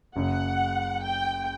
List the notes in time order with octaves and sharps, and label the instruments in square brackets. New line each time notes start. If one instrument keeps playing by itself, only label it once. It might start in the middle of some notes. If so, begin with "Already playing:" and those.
[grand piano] F#1 F#2 C#3 [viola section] F#5
[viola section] G5